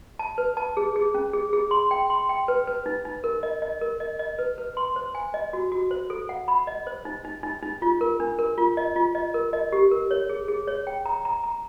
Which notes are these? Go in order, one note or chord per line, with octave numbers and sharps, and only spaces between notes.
A5
B4
A5
G#4
G#4
C#4
G#4
G#4
C6
G5
C6
G5
B4
B4
D#4
D#4
A#4
D#5
D#5
A#4
D#5
D#5
B4
B4
C6
C5
G#5
D#5
F#4
F#4
C5
A4
F#5
B5
D#5
C5
D#4
D#4
D#4
D#4
F4
A#4
D4
A#4
F4
D#5
F4
D#5
A#4
D#5
G4
A#4
C#5
G#4
G#4
C#5
G5
A#5
A#5
A#5